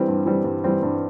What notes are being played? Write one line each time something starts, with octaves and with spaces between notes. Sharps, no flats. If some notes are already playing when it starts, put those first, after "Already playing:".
Already playing: E3 G3 C4
G2
E3 G3 C4
G2
E3 G3 C4
G2